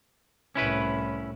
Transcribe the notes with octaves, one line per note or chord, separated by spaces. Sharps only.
C2 A2 C#4 E4 B4